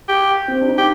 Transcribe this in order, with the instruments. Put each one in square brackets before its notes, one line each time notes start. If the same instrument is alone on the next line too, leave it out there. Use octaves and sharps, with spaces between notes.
[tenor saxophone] G4
[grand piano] C4
D4
D#4
[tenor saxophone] G4